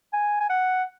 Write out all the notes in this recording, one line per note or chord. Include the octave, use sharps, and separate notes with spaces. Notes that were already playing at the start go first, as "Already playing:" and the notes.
G#5
G#5
F#5